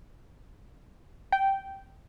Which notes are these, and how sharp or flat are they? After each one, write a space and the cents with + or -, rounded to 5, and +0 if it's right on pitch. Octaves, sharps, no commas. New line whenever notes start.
G5 -10